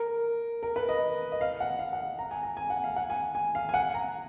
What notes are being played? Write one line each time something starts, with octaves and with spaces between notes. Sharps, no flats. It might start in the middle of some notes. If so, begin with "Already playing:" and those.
Already playing: A#4
A#4
B4
D#5
D#5
F5
F#5
F5
F#5
A#5
G#5
A#5
G#5
F#5
F5
F#5
G#5
G#5
F5
G#5
F#5
A#5